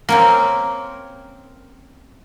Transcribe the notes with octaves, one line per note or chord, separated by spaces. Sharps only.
A#3 C4 C#4 A#4